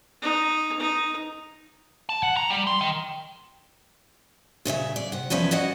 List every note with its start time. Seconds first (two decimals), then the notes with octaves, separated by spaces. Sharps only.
0.22 D#4
0.79 D#4
2.09 A5
2.23 F#5
2.37 A#5
2.50 G3
2.67 C6
2.81 D#3
4.65 A#2 C#3 C#5 E5
4.96 D5
5.12 C3 F#5
5.30 E2 F3 C#4 D5 E5
5.51 F#4 D5 D#5 F#5